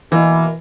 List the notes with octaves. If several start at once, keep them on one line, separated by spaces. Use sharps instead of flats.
B2 E3 A#3 E4 A#4